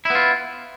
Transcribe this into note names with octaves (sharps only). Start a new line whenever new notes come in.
B3 E4 F4